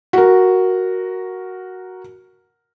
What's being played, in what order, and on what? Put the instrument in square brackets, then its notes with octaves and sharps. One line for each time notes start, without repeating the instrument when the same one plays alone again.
[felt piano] F#4 A#4